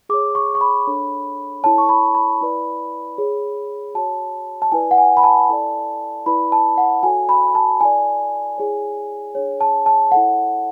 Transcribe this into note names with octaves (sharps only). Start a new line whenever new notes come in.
G#4 C#5 D6
C#6
C#6
B5
D4 A4 C#5
E4 A4 C#5 A5
C#6
B5
B5
E4 B4 D5
G#4 C#5
F#4 C#5 A5
A5
E4 B4 D5 G#5
F#5
G#5
B5
A5
E4 A4 D5
E4 B4 D5 B5
A5
F#5
F#4 A4 C#5 G#5
B5
A5
E4 A4 D5 G#5
E4 G#4 C#5
D4 G#4 C#5
A5
A5
E4 A4 C#5 F#5